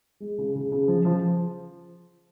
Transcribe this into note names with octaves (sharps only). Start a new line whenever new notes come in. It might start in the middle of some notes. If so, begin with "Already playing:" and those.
G#3
C#3
C#3
C#3
F3
F3